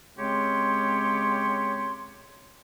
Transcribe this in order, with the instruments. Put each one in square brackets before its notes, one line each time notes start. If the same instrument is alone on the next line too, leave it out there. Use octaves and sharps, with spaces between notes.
[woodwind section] C#3 G#3 C4 G4 C#5 C6